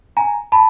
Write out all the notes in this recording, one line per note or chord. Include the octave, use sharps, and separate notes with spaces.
G#5 A#5
A5 B5